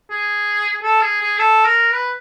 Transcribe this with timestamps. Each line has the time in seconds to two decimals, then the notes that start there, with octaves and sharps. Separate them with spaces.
0.11 G#4
0.83 A4
1.02 G#4
1.21 G#4
1.39 A4
1.65 A#4
1.93 B4